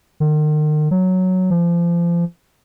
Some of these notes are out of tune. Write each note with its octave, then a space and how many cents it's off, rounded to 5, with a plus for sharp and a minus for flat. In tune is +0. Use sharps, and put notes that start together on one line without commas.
D#3 -40
F#3 +0
F3 -30